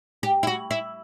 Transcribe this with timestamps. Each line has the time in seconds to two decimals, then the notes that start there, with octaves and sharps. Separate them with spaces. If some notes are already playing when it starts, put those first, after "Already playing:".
0.23 G4
0.43 E4
0.47 F#4
0.71 E4